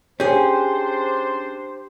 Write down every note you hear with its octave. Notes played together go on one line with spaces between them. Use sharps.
C#4 D4 G4 G#4 C5 G6